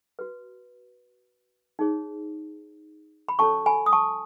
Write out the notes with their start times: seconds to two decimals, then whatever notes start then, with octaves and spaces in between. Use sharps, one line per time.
0.19 F#4 B4
1.79 D#4 G#4 C#5
3.29 B5
3.39 C#4 F#4 A4 C#5 A5 C#6
3.66 G#5 B5
3.86 D#6
3.92 A5 C#6